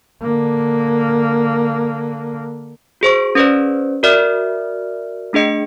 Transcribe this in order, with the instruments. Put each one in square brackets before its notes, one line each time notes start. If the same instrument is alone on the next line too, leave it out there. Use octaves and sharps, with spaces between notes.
[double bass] D3 A#3
[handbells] F#4 G#4 C5 C#6
C#4 G#4 B4 C5 D5
F#4 A#4 D5 E5 F6
A3 D4 G#4 D#5 C#7